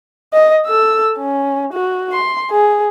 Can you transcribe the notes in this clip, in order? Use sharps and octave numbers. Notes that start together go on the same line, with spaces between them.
D#5
A4 E6
C#4
F#4
C6
G#4